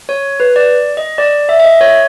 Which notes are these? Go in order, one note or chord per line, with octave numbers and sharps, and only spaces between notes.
C#5
B4
D5
D#5
D5
E5
E5
D#5
C#5